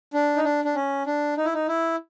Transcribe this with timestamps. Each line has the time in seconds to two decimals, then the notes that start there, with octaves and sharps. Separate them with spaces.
0.14 D4
0.36 D#4
0.44 D4
0.65 D4
0.75 C#4
1.06 D4
1.37 D#4
1.45 E4
1.54 D#4
1.68 E4